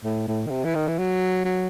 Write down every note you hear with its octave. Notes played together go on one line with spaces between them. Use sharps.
A2
A2
D#3
C3
E3
D#3
E3
F#3
F#3